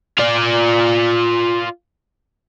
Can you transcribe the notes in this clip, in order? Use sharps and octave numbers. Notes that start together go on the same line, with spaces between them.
F4 D5